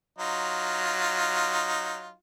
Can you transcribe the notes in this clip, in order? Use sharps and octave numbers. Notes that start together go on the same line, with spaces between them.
F#3 D#4 F4